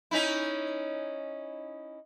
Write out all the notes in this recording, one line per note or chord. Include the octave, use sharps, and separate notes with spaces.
C#4 D#4 E4